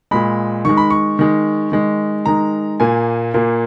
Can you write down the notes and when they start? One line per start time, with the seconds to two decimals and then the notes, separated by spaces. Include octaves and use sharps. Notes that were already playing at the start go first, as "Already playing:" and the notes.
0.11 A#2 G#3 B5
0.65 D#3 G#3 C#6
0.77 B5
0.90 C#6
1.19 D#3 G#3
1.72 D#3 G#3
2.26 D#3 G#3 A#5
2.80 A#2 A#3 G#5
3.34 A#2 A#3